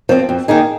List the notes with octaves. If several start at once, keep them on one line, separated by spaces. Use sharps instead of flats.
F3 C4
F2
D#3 A#3 D#4 G#4